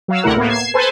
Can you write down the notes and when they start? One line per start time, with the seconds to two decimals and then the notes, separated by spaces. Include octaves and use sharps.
0.08 F#3 F5 E6
0.23 D2 C3 A3 E4 A#4 F#5
0.36 A2 A#3 B3
0.49 G#6 C7 E7
0.74 A4 B4 C5 G#5 A5